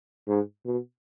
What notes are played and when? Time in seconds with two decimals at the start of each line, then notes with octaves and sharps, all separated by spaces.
0.28 G#2
0.65 B2